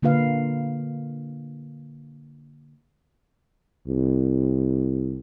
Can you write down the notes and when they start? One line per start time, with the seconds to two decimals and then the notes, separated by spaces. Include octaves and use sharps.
0.03 D3 A#3 F4 B4 F5
3.87 C2